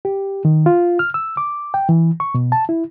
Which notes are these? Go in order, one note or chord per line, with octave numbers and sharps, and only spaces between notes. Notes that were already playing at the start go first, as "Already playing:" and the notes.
G4
D#3
F4
F6
E6
D6
G5
E3
C#6
B2
A5
E4